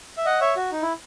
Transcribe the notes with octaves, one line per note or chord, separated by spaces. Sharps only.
E5
D#5 F#5
C#5 E5
F#4
D#4
E4